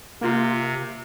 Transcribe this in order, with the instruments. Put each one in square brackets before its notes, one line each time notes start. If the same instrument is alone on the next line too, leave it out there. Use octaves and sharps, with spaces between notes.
[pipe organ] C3 [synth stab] A#3 F4